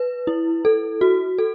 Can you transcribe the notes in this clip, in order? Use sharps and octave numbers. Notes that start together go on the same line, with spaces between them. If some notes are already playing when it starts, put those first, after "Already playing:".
Already playing: B4
E4
A4
F#4
A4